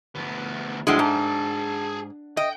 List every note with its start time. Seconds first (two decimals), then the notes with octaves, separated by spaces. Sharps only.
0.15 D2 B3
0.87 A2 F3 G#3 D4 F#5 D7
0.99 G#2 G#4 A5
2.37 D#5 G5